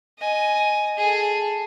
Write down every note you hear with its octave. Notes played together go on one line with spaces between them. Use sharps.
D#5 G#5
G#4 A4